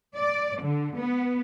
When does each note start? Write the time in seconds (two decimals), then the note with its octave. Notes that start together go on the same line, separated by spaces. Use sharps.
0.15 D5
0.61 D3
0.97 B3